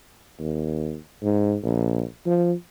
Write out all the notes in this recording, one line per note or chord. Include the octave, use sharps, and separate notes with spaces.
D#2
G#2
A#1
F3